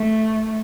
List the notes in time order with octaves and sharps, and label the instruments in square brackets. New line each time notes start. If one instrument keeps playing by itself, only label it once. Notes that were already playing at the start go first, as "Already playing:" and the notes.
Already playing: [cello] A3